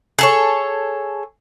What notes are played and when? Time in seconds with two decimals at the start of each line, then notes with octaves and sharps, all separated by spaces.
0.19 G#4 A4 C#5